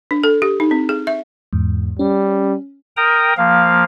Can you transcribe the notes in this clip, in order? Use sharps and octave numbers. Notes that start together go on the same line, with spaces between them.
D4
A4
G4
D#4
C4
G#4
E5
E2 G#2
G3 C#4
A#4 G5 A#5 D#6
F3 A#3 F5